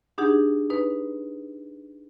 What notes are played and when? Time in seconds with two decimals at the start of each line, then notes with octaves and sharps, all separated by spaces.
0.18 D4 D#4 G4 G#4 F#5
0.70 D#4 B4